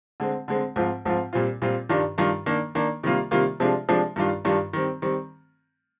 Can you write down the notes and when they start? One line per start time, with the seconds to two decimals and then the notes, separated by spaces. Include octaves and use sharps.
0.20 D3 G#3 C4
0.48 D3 G#3 C4
0.76 G#2 F3 C4 F4
1.05 G#2 F3 C4 F4
1.33 A#2 G3 C4 F4
1.62 A#2 G3 C4 F4
1.89 G2 D#3 G3 D4 F4
2.18 G2 D#3 G3 D4 F4
2.46 D#3 A#3 D4
2.75 D#3 A#3 D4
3.03 C3 D#3 G3 A#3 F4
3.31 C3 D#3 G3 A#3 F4
3.60 C3 F3 G#3 D4 F4
3.89 C3 F3 G#3 D4 F4
4.16 G2 D#3 G3 D4 F4
4.45 G2 D#3 G3 D4 F4
4.73 D#3 G3 C4
5.02 D#3 G3 C4